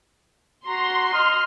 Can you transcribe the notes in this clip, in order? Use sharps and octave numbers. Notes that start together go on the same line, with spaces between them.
F#4 A#5 C6
D#5 F6